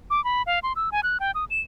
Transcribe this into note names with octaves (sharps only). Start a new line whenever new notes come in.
D6
B5
F5
C6
E6
G#5
F#6
G5
D#6
E7